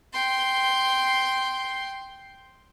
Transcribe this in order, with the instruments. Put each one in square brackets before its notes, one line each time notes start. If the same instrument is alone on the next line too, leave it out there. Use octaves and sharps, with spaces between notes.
[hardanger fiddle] G5 C6